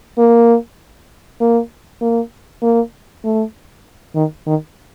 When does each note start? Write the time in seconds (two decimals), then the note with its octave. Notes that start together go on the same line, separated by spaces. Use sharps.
0.18 A#3
1.41 A#3
2.02 A#3
2.62 A#3
3.24 A3
4.15 D#3
4.47 D#3